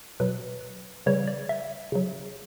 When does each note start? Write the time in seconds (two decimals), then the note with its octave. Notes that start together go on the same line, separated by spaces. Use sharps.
0.20 B2 F#3 B4
1.06 C#3 E3 G3 C#5
1.27 D5
1.49 E5
1.92 C#3 F#3